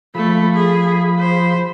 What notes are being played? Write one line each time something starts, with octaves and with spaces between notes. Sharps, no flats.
F3 A3 B5
G#4
C5